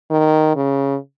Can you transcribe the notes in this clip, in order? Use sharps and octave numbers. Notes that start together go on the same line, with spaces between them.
D#3
C#3